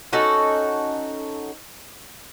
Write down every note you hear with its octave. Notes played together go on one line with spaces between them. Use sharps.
C#4 D#4 F#4 A4